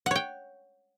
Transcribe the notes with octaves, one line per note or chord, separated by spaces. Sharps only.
C#5 F#5 G5